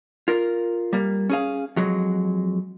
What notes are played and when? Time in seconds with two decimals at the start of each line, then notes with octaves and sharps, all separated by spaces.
0.28 F4 A#4
0.93 G3 A#3
1.30 C#4 G#4 F5
1.76 F2 F#3 G#3